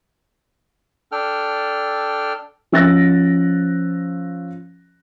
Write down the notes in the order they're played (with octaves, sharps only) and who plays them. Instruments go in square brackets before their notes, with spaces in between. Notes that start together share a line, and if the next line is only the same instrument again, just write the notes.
[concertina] D4 A4 G5 F6
[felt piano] F3 C#4 E6 F#6 A6 A#6